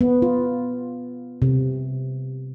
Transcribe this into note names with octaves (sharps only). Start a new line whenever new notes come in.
B3
F4
C3